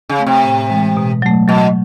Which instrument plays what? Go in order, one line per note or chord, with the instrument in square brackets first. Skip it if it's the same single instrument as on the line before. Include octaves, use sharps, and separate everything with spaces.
[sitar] C#3
[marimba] A3 C4
[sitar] C3
[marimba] A2
E3 G#3
B2
F#3 A3
[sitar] B2 [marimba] F#3